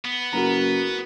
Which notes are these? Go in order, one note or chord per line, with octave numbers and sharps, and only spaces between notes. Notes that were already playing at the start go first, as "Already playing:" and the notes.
B3
F#1 F#4 A#4 A#5